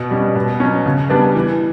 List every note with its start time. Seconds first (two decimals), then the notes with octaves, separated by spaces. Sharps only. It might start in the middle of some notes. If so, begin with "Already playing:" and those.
Already playing: B2
0.11 G3 C#4
0.35 B2
0.60 F#3 C#4
0.86 C#3
1.10 G3 B3 D4
1.35 E3